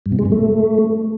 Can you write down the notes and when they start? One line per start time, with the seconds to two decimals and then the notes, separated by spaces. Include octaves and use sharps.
0.06 G2
0.12 B2
0.19 G#3
0.25 G2
0.32 A3